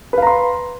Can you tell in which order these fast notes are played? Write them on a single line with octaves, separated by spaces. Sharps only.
B4 F5 A#5 C6